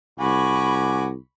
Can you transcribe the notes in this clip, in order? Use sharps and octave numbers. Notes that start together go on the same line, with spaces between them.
C2 F#4 G#5 B5 C#6 D6